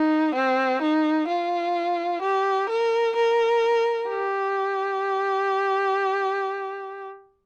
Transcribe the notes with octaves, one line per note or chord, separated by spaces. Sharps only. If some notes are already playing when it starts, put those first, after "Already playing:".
Already playing: D#4
C4
D#4
F4
G4
A#4
A#4
G4